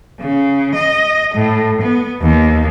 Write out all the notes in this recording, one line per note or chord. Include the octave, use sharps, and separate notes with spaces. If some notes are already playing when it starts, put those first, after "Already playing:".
C#3
D#5
A2
B3
D#2